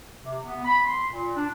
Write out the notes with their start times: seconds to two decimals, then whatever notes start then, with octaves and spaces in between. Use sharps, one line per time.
0.25 C3
0.44 B3
0.64 B5
0.85 C6
1.11 A#2
1.36 D4